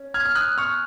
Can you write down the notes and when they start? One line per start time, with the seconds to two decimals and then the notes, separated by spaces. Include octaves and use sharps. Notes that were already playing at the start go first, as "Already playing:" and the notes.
Already playing: C#4
0.14 F6 G#6
0.25 F6
0.35 D#6 F#6
0.58 C#6 F6